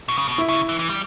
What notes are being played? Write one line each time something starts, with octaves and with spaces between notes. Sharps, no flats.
B2
C#3
B2
E4
C#3
E3
E3
G3